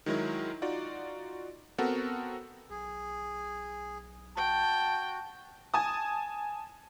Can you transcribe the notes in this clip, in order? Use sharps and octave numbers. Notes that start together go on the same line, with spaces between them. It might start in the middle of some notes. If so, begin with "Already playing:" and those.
D#3 F#3 G#3 E4 A#4
D#4 F4 F#4 D5
B3 C4 F#4 A4 A#4 F#5
B1 G#4
F#4 G5 A5
G#5 A5 D#6